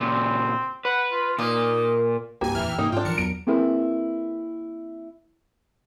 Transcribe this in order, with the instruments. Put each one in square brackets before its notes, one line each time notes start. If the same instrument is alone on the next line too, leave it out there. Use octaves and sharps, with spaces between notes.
[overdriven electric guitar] A#2 C#3 [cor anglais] C4
[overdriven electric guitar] B4 [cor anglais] F#5
[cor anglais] F4
[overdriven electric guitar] A#2 [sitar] A#3 [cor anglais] D#4
[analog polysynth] C2 G2 G#5 [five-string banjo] A#3 [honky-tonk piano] G4
[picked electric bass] D#1 F2 [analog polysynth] E3 E5 F6
[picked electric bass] G#2 C3 [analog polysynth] A#3 [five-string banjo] D#4
[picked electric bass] G#2 [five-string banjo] D4 F4 [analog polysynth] G5
[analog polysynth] B1 A#4 C#7 [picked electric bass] E3 F3
[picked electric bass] E2 F#3 B3 [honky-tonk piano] D7
[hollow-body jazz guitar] A#3 C4 E4 G#4 A#4 B4